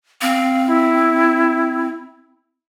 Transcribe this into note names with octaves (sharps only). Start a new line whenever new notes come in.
C4 F5
E4